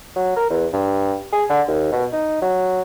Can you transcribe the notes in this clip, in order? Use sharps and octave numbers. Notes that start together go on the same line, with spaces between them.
F#3
A#4
E2
G2
G#4
D3
D#2
B2
D#4
F#3